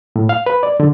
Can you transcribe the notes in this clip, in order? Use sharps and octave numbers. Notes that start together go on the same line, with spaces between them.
A2
F5
B4
D5
D3